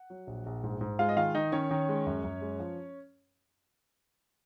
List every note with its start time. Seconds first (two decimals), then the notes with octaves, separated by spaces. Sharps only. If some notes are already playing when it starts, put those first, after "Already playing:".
Already playing: F#5
0.10 F#3
0.27 A#1
0.46 A#1
0.64 G#2
0.81 G#2
0.99 G#3 F4 F5
1.09 D#5
1.16 D#3 F4 F5
1.35 D#3 D#4 D#5
1.52 D#3 C#4 C#5
1.71 D#3
1.89 G#3
2.07 F#2
2.24 F#2
2.41 G#3
2.60 F3